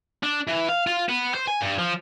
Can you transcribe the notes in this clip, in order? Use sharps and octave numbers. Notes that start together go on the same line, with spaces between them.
D4
E3
F5
F4
B3
C5
G#5
G2
F3